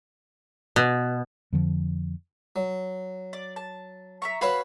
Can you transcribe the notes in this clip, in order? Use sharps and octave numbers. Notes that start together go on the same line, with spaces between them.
B2
F2 D3 F3
F#3
D5
A5
E5 A#5 C#6
F#4 B4 C#5 F5 B5 E6